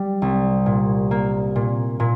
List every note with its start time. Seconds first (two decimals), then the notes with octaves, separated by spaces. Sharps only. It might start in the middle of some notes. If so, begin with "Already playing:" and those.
Already playing: G3
0.22 C2
0.66 A#2
1.11 A#3
1.56 A#2
2.00 A#2